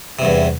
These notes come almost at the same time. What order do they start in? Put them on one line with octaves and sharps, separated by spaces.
C3 G2 E2